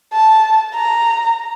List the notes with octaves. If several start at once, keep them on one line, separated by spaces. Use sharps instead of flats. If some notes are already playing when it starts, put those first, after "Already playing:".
A5
A#5